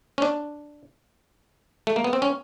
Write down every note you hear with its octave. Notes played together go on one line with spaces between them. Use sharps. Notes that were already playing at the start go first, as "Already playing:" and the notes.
C#4
D4
A3
A#3
B3
C4
C#4